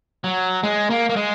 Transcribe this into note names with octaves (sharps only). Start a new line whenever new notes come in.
F#3
G#3
A#3
A#3
G#3